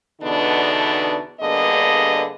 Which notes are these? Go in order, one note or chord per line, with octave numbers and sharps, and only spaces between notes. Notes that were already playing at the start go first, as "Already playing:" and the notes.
E2 B2 D3 B3 D4 D#4
G2 D3 A#3 B3 G#4 D#5